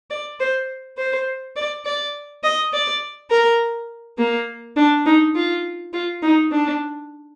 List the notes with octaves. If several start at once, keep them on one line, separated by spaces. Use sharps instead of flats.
D5
C5
C5
D5
D5
D#5
D5
A#4
A#3
D4
D#4
F4
F4
D#4
D4